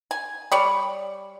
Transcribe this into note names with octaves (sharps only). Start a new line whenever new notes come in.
G#5
G3 C#5 D5